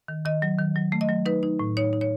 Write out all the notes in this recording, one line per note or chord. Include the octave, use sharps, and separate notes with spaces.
D#3
D#3 D#5
F#3
D#3
F#3
A3
D#5
F#3
D#4 B4
D#4
A2
D#4 C#5
D#4
C#5